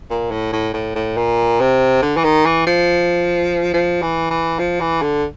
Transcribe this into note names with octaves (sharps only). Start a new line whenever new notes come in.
A#2
A2
A2
A2
A2
A#2
C3
D3
E3
D#3
E3
F3
F3
E3
E3
F3
E3
D3